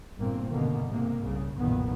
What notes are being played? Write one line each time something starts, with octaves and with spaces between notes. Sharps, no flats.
G1 G2 A#2 A#3 C4
G1 C2 B2 D3 D#3 A#3
G#2 C3 A#3
C2 C#3
F#1 B1 A#2 D#3 B3